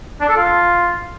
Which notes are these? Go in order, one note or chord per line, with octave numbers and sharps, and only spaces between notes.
D4
A4
F4